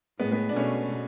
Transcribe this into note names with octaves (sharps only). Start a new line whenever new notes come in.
A2 G#3 B3
G#3 B3
D4
B2 A3 C#4